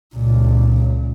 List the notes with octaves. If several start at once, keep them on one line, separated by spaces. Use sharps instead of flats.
C#2 A#2